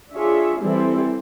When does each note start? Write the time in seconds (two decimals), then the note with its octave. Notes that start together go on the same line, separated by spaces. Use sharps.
0.14 D4 F4 G#4 C#5 E5
0.61 E3 G3 C4 E4 A4